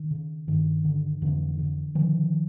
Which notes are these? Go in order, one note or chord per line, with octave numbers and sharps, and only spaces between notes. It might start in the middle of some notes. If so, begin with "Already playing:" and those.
Already playing: D#3
C#3
G2 D#3
D3
F2 D3 E3
D3
D3 D#3 F3